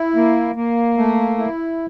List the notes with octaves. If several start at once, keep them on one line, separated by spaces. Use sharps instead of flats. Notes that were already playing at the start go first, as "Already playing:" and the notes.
Already playing: E4
A#3
A#3
A3
E4